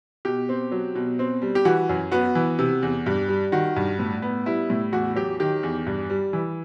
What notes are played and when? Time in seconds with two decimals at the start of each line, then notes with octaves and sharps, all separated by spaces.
0.25 B2 G4
0.49 C4
0.71 F#3
0.95 B2
1.19 C4
1.42 G3
1.55 G4
1.65 E3 F#4
1.89 F#2
2.12 B3 F#4
2.35 E3
2.59 C3
2.83 E2
3.06 G2
3.29 G3
3.52 D#3 F#4
3.76 G2
3.99 A2
4.22 B3
4.46 G3 E4
4.70 A2
4.92 E2 F#4
5.16 F#3 G4
5.40 D#3 G4
5.63 E2
5.86 G2
6.10 G3
6.33 E3